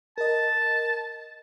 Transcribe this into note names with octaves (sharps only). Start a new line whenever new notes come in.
A#4 D#5 A5